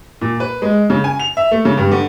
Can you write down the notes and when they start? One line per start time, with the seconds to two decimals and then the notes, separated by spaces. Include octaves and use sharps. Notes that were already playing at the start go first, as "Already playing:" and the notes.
0.21 A#2
0.40 B4
0.62 G#3
0.90 C#3
1.04 G#5
1.19 F7
1.37 E5
1.51 A3
1.65 C#3
1.77 G2
1.91 D3